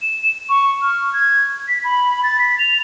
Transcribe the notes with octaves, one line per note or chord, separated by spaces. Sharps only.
E7
C#6
F6
G#6
B6
B5
A6
B6
F7